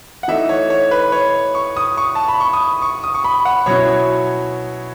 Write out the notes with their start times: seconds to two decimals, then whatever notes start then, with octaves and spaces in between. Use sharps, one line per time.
0.23 F#5
0.28 E3 A3 D#4 E5
0.49 C#5
0.70 C#5
0.91 B4
1.12 C#5
1.55 C#6
1.77 D#6
1.97 C#6
2.15 A5
2.28 B5
2.40 C#6
2.53 D#6
2.82 C#6
3.04 D#6
3.14 C#6
3.24 B5
3.45 F#5
3.66 B2 F#3 C#4 E4 C#5